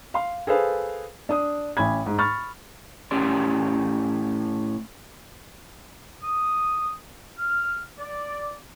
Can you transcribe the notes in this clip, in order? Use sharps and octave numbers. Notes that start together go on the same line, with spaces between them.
F5 C6
G#4 A4 B4 C5 F5
D4 D#6
A1 C#4 B5 G#6
G#2
B5 C#6 F6 A6
A2 C#4 G4 D5 C6
D#6
F6
D5